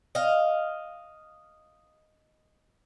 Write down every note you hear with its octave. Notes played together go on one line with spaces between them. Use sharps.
D#5 F5